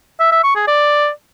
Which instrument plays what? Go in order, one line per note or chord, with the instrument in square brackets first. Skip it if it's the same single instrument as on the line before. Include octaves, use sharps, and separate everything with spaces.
[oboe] E5
E5
C#6
G#4
D5